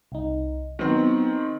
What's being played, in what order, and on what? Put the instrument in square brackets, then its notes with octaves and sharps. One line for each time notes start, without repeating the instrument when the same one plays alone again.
[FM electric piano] C2 D#4
[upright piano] D#3 C4 [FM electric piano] F#3 B3